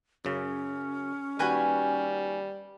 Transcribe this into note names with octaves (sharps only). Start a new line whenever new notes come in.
F#2 C#3 C#4
D#2 G3 F#4 B4 G#5 G6